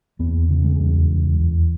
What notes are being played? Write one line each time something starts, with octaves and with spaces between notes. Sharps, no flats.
E2 B3
C#3
G#3
E2
E2
E2